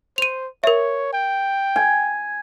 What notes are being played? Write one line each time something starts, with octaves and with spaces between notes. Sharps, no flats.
C5 D#7 F7
A#4 C#5 E5
G5
G#5